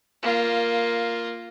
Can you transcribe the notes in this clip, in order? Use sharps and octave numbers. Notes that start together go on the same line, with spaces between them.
A#3 F4